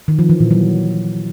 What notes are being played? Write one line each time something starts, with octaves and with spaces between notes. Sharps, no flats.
D#3
F3
E3
A#2
F#3